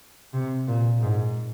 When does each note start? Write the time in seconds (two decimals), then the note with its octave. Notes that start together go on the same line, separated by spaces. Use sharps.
0.34 C3
0.68 A#2
1.02 G#2